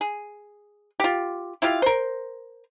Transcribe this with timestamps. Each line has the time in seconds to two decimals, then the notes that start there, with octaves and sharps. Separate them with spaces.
0.01 G#4
1.00 F4 G4
1.62 E4 F4 G4 F5
1.82 A#4 C5